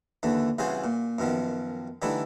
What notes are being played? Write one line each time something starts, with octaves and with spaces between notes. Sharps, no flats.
D#2 D3 E3
C2 C#3 E3 F#4 G#4 C5
A#2
F#2 B2 D#3 F3
D3 E3 G3 A3 D#4 E4